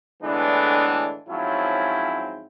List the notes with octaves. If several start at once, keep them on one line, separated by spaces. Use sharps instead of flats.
A2 D3 E3 G#3 B3 D4
G#2 F3 F#3 C4 C#4 E4